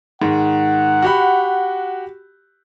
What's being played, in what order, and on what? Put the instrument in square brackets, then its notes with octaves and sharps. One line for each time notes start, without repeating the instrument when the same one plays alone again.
[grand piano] G#2 D#3 [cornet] F#5
[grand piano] F#4 G4 B5